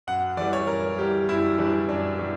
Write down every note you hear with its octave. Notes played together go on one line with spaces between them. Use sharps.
F#2 F#5
E3 G3 D5
C#5
F#2 A#4
E3 G3 G4
F#2 E4
E3 G3 D4
F#2 D4
E3 G3